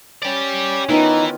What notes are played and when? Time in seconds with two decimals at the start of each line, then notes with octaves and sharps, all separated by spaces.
0.23 C#4 G4 D5
0.89 D#3 E3 B3 D#4 F4